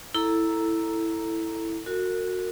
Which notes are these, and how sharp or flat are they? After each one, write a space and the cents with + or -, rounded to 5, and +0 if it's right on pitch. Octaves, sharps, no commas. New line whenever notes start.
E4 +0 A4 +5 A#5 +0
F#4 -15 A#4 -35